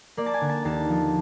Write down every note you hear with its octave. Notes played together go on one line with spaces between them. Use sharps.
A#3 D5
A5
G#5
D3
A5
D#2 A5
F3